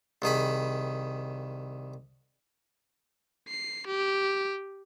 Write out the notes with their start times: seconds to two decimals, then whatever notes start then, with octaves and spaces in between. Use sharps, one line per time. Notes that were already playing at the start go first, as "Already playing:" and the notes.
0.22 C2 D#3 G#4 B5
3.48 C7
3.87 G4